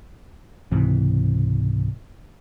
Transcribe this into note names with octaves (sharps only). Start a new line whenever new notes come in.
C#2 G#2 C3 E3